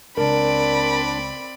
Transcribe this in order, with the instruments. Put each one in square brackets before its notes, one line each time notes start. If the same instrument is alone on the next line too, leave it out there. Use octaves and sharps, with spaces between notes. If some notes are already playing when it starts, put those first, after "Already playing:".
[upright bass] C#2 [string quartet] C4 D5 B5 [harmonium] D4 [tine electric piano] A#4